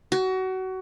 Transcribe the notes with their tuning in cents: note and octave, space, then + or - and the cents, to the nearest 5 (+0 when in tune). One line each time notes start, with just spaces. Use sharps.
F#4 +25